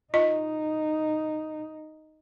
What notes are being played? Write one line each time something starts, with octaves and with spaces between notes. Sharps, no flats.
D#4 F4 D#5